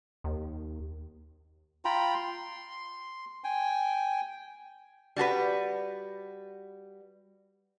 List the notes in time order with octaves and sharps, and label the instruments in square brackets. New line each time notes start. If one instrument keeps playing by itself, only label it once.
[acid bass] D#2
[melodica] F4 G5 A#5 B5
C6
G5 G#5
[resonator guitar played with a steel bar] G3 F#4 G#4 B4